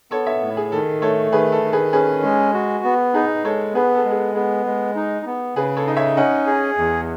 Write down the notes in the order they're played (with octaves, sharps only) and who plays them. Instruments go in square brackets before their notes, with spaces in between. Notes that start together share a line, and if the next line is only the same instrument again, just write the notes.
[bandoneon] B3 [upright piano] A4 C#5
[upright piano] C#5 E5
[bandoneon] A2
[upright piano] G#4
[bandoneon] D#3 [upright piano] A4
[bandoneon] A3 [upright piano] A4 C#5
[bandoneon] D#3 [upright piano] G#4 B4
[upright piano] A4
[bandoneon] D#3
[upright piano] G#4 B4
[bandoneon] C#4 [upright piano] G#4 B4
[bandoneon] G#3
F#4
B3
[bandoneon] D#4 [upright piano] G#4 B4
[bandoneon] G#3 [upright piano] A4 C#5
[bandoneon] B3 [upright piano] G#4 B4
[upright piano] A4
[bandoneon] G#3
[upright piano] G#4
A4
[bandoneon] B3 [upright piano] G#4
[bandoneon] G#3
D#4
B3
[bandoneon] C#3 [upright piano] G#4 B4
[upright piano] A4 C#5
[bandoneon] D#4 [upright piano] D#5
[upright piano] C#5 E5
[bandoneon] C#4 [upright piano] D#5 F#5
[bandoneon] G#4
E2